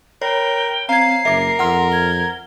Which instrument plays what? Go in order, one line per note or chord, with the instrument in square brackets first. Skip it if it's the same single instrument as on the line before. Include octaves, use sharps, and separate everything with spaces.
[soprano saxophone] A#4 [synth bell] C#5 [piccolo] G5
[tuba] C4 [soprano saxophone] F5 [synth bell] A#5 G#6 [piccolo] C7
[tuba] F#1 [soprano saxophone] A#4 [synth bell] E5 D6
[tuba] F2 [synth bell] F#5 F6 [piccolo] C6
[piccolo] G#6 [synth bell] G7